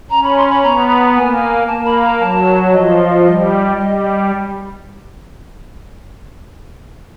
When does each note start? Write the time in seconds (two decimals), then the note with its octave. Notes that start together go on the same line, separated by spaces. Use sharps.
0.10 C#4 A#5
0.23 B5
0.36 C6
0.50 B5
0.63 B3 A#5
1.15 A#3 G#5
1.68 A#3 A5
1.85 B5
2.03 A#5
2.20 F#3 A5
2.72 F3 D#5
3.24 G3 D#5
3.77 G3 D#5